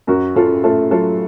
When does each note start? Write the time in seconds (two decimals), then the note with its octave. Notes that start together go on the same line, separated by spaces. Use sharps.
0.07 F#2 F#4 A#4
0.35 C#3 F4 A4
0.64 A3 F4 A4
0.91 F#3 F4 A4